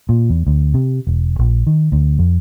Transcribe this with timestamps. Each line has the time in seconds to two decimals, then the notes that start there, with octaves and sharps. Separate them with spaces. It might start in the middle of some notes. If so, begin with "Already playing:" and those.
0.09 A#2
0.30 E2
0.47 D2
0.74 C3
1.07 E1
1.39 A#1
1.67 D#3
1.92 D2
2.19 F2